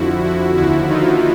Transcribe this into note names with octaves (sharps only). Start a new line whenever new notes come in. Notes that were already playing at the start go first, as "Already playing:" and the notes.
Already playing: F2 D3 F3 E4 F#4
E4 F#4
D#2 D3 F3 E4 F#4
D#4 F4